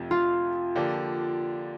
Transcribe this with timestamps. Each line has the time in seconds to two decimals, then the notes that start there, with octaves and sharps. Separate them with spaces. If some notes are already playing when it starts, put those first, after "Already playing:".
Already playing: F2 C3 F3 A3
0.11 F4
0.75 D3 F3 A#3 D4 G4